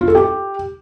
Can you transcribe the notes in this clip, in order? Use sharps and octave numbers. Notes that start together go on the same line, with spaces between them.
F4
A4
G4